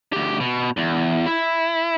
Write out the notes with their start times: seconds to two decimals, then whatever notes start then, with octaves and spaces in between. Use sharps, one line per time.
0.13 D2 G4
0.40 B2
0.77 E2
1.26 E4